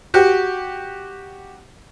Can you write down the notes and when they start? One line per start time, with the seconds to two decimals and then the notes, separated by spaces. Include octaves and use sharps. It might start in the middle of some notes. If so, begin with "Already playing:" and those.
0.14 F#4 G4